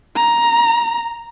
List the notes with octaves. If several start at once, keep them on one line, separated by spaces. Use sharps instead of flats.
A#5